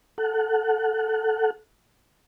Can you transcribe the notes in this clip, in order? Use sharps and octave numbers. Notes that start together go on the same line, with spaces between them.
A4 F#5